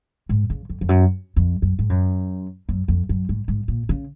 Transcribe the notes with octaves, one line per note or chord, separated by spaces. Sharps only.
G#2
C#3
F2
F2
F#2
F2
F#2
G#2
F#2
F#2
F2
F#2
G#2
G#2
A#2
C#3